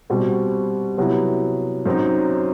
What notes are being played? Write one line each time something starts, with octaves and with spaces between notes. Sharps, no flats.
B2 G3 C4 F#4
C3 F#3 B3 E4
F#2 F#3 C4 D#4